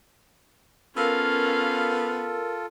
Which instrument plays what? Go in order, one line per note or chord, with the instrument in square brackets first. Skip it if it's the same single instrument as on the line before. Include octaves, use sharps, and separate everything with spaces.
[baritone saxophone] B3 [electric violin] C#4 F5 [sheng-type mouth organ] F4 A4 [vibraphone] A#4 E6